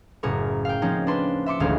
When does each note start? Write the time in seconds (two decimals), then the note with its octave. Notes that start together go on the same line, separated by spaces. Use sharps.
0.23 F#1 A2 G#4 A#4 C#6
0.65 F5 G5
0.82 F3 A#3 C4 C#4 D#4
1.07 D4 B4 A5 C6
1.46 E5 C6 D6 C#7
1.60 D#1 G#1 D2 G#3 C#4 F5